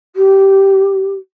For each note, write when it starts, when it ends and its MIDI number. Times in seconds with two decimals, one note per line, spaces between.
0.16 1.13 67